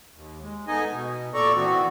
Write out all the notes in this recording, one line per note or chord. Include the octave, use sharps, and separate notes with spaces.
D#2
G#3
A3 B3 D#4 D#5 G#5
B2
A#2 A4 D5 A#5 C#6
E3 B3 C4 F#4